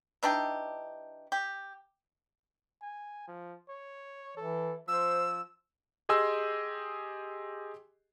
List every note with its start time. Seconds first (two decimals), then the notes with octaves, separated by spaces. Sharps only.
0.23 E3 D4 D#4 G4
1.32 G4
2.81 G#5
3.28 F3
3.69 C#5
4.37 E3 A4
4.88 F3 C5 E6
6.09 G4 G#4 D#5 G#5 C6 E6